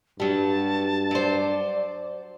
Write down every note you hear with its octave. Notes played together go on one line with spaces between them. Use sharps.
G2 F#3 G3 A5
F#3 C5 D5